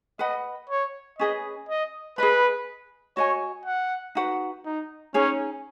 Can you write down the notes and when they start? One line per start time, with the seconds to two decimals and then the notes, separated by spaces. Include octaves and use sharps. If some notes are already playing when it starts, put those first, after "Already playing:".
0.19 B4 D#5 F#5 B5
0.69 C#5
1.18 C#4 G#4 B4 D#5
1.69 D#5
2.18 G#4 B4 D#5 B5
3.17 F#4 C#5 D#5 G#5
3.66 F#5
4.15 D#4 F#4 B4 F#5
4.65 D#4
5.14 C#4 D#4 G#4 C#5 G#5